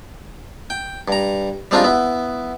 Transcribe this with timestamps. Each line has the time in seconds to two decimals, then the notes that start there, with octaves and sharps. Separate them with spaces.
0.70 G5
1.08 G2 A#5
1.71 G3 G#3 C4 D4 D#4 F4
1.84 B3 E4